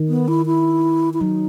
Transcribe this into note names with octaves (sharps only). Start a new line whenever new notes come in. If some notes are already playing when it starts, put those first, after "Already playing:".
Already playing: D#3
B3
E4
E4
E4
F#3 D#4